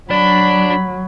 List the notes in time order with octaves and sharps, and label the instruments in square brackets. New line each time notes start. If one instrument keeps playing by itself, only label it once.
[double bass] F#3 [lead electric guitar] D4 D5 [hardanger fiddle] B5